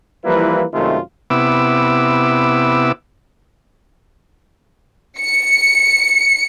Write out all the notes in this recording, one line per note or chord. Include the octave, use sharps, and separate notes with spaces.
E3 F3 G3 A#3 E4 B4
F#2 C3 D#3 G#3 A3 F4
C3 B3 E4 D6 E6
C#7